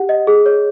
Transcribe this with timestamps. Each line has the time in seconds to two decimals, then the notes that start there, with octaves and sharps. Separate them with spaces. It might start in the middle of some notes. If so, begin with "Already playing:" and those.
Already playing: G4 F#5
0.09 D#5
0.27 G#4
0.46 C#5